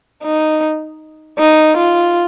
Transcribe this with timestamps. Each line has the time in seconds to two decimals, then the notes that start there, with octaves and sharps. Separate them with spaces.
0.24 D#4
1.39 D#4
1.77 F4